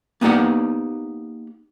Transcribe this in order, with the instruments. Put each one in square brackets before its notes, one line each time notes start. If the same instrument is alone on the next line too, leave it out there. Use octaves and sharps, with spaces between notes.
[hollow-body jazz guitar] A#3 B3 D#4 G4 D5 F#5